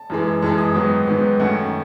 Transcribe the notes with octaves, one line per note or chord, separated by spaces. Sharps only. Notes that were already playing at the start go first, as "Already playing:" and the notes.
Already playing: A5
F#2 E3 G#3
F#2 E3 G#3 A5
D#6
G#2 D#3 F#3 B3
G#2 D#3 F#3 B3
F#2 D#3 A3 C#4 F#5